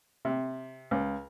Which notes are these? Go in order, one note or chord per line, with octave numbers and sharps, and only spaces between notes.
C3
C#2